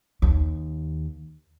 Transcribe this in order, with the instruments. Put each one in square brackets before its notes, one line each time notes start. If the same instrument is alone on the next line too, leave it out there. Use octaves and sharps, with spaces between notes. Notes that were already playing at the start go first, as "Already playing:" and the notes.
[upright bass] D#2